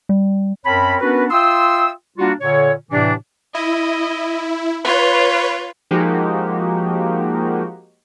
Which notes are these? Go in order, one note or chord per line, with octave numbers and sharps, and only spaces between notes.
G3
F#2 C4 A#4 C#5 A5 B5
B3 C#4 D4 F#4 A#4 B4
F4 E5 G5 C6 D#6 E6
G3 A#3 D4 F4 F#4
A#2 D3 C#5
A2 C3 E3 D4
E4 D#5
F4 B4 C#5
F3 G#3 A#3 D#4 F#4 G4